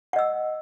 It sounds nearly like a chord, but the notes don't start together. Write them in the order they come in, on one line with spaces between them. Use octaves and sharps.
F#5 D#5 E6